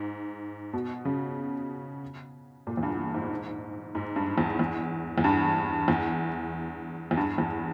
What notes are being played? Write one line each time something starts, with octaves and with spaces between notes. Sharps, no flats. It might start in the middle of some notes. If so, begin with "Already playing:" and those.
Already playing: G#2
B2
C#3
A#2
E2
G2
G#2
G#2
G2
E2
E2
E2
G2
E2
E2
G2
E2